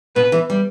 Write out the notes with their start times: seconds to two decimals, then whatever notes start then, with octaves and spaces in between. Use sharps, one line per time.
0.16 B2 B4
0.32 E3
0.50 G3